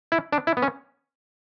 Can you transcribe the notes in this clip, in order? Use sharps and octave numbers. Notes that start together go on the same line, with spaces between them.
E4
D4
E4
B3
C#4